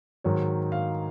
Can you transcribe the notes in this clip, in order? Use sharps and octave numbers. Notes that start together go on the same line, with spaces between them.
G#2 D#3 F#3 C#5
F5